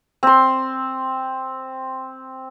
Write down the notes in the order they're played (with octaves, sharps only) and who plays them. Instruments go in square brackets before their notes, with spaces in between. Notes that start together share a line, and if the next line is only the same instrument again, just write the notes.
[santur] C4 C6